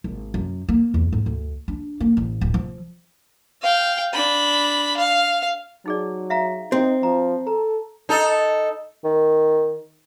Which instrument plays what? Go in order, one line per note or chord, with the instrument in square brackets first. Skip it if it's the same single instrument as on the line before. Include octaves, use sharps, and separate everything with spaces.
[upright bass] G#1
F#2
A#3
E2
G#2
D2
D4
A#3
A1
D1
F3
[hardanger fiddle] F5 G5
D4 B5
F5
[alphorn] F#3 [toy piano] D#4 G#4 D5
[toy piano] E5 F5 A#5
[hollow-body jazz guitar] C4 [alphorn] D#4 [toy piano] F#4
[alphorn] F3 [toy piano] A#5
[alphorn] A4 [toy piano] A#5
[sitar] D#4 A4
[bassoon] D#3